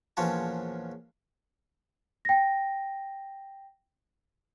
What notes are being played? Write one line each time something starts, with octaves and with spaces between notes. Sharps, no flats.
A#1 E2 F3 C#4 C#5 A5
G5 A#6